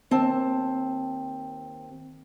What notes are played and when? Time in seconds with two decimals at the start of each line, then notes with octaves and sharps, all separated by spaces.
0.11 D#2 C4 A5